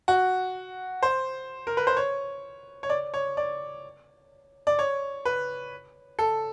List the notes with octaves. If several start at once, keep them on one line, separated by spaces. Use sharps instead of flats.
F#4
C5
A#4
B4
C5
C#5
C#5
D5
C#5
D5
D5
C#5
B4
A4